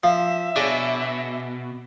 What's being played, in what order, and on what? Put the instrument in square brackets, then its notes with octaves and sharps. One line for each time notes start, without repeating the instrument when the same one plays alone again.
[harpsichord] F3 [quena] E5 [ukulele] F5
[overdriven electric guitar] B2 [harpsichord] D4 [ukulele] G#4 C#5